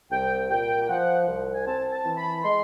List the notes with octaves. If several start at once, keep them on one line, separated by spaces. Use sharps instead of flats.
C2 G5
A#2 G5
G5
F3 F#5
C2
G#5
C4 A5
A5
E3
B5
G#3 C6